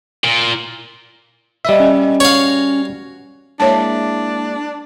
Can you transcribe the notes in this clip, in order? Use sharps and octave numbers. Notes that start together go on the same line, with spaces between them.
A#2
A#2 G3 B4 D#5 E5
C#4
F#4 C#5 F5
G#3 A#3 D4 E4 C#5 A5